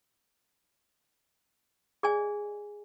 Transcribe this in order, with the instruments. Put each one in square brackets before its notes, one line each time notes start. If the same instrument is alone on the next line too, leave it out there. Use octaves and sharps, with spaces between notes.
[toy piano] G#4 D5 D#5 G#5